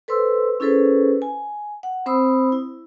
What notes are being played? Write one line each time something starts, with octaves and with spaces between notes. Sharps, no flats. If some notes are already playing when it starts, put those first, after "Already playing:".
A4 B4 C5 C6 E6
C#4 E4 G#4 A4 B4 C5
G#5
F#5
C4 C5 B5 D#6 E6
E4